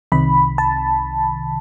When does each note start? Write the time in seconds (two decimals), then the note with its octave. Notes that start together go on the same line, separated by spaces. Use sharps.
0.12 C2 C3 D#3 B5
0.58 A5